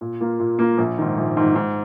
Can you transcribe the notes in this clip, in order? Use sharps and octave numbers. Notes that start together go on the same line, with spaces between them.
A#2
A#3 F4
A#2
A#3 F4
A#1
G#2 D#3
A#1
G#2 D#3
G#2